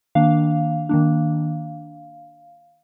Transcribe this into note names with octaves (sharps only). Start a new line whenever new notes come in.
D#3 A#3 D4 F5
D#3 A#3 D4